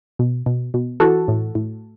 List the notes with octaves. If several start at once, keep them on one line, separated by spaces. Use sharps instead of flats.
B2
B2
B2
E3 F#4 A4
A2
A2